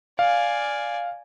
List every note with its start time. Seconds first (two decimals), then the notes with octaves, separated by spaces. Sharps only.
0.19 D5 F5 G#5